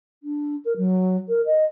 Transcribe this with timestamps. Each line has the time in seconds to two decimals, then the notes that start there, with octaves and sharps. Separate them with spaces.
0.23 D4
0.65 A#4
0.76 F#3
1.28 A#4
1.45 D#5